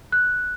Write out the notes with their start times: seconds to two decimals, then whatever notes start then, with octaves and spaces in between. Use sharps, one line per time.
0.12 F#6